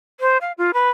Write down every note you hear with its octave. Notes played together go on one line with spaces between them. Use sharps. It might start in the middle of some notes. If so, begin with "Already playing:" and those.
C5
F5
F4
B4